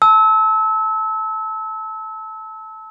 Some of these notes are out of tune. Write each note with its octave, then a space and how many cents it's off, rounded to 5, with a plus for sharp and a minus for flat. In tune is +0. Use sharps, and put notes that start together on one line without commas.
A5 +0 E6 -30